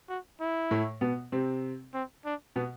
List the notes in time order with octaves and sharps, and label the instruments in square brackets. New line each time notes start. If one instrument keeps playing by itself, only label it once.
[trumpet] F#4
E4
[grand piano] A2 A3
B2 B3
C3 C4
[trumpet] C4
D4
[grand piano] B2 B3